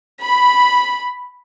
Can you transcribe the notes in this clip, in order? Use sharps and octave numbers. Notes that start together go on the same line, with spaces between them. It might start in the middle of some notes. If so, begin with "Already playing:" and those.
B5